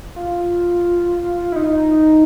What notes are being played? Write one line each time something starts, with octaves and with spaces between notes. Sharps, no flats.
F4
E4
D#4